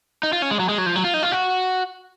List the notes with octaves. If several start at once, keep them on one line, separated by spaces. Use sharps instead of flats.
D#4
F4
C#4
G#3
F#3
G#3
F#3
F3
F#3
F4
D#4
F4
F#4